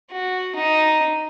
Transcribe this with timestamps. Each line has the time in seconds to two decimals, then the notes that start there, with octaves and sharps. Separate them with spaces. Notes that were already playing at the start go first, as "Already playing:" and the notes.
0.11 F#4
0.56 D#4